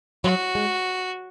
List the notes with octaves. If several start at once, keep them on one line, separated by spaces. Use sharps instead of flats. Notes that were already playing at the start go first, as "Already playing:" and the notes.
F#3 F#4
G#3